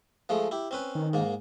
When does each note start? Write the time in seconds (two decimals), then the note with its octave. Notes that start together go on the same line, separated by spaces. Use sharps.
0.29 F3 G#3 A3
0.51 E4 G4
0.71 C4 C#4 B4
0.95 D#3
1.13 G#2 A#3